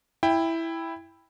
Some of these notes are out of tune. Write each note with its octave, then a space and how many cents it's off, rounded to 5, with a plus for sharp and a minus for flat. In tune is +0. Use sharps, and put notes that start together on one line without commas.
E4 +0 G5 +15